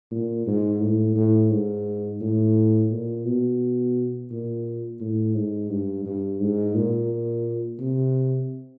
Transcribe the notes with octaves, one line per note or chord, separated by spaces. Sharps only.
A#2
G#2
A2
A2
G#2
A2
A#2
B2
A#2
A2
G#2
G2
G2
G#2
A#2
C3